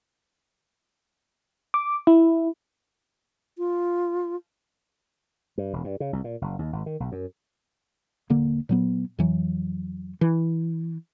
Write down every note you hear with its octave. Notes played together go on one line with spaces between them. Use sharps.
D6
E4
F4
G2
E1
G2
C#3
C2
A#2
F#1
D#2
G#1
D#3
B1
F#2
D#1 D3 A#3
A#2 F#3 B3
F2 E3 F#3
E3